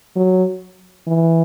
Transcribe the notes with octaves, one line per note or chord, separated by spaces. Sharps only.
F#3
E3